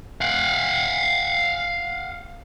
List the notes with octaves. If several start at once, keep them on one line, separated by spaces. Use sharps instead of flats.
F5 F#5